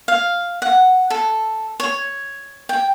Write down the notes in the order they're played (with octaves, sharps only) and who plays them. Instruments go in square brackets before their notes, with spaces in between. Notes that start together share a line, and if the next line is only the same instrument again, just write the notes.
[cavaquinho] F5
F#5
A4
C#5
G5